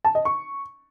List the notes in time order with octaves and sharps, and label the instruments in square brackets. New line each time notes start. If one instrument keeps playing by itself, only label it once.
[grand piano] A5
D#5
C#6